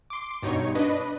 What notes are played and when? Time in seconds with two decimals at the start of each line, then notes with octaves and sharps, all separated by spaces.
0.10 C6 D6
0.43 G2 B2 D#4 C#5 C#6
0.75 D4 B4 D#5